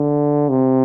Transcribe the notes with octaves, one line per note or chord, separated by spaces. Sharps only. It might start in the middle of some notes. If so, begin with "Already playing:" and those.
Already playing: D3
C3